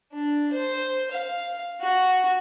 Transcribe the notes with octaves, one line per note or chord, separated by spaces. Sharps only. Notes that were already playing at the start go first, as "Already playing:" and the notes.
D4
C5
F5
F#4